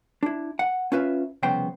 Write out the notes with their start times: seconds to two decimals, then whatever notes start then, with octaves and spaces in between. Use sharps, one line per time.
0.23 D4 E4
0.59 F#5
0.92 C#4 F4 B4 E5
1.43 C2 F2 C#3 B3 C5 G5